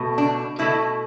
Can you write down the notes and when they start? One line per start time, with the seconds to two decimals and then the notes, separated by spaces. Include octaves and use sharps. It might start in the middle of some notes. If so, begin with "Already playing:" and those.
Already playing: B2 A3
0.18 D4
0.59 B2 A3 E4